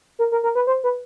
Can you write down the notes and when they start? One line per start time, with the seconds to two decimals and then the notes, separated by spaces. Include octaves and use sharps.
0.19 A#4
0.32 A#4
0.43 A#4
0.55 B4
0.67 C5
0.84 B4